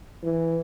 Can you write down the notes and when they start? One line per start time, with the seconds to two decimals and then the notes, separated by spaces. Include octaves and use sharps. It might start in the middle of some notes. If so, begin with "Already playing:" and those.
0.23 E3